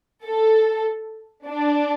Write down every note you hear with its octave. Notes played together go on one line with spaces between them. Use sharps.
A4
D4